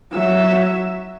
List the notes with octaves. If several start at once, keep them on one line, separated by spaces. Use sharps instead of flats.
F#3 E5